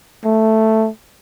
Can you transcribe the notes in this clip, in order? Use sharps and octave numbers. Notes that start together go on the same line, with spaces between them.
A3